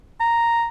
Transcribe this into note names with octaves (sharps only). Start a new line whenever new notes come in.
A#5